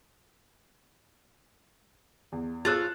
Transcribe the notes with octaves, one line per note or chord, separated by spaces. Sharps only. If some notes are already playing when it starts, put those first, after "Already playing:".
E2
F4 G#4 C#5 E6 F#6 A6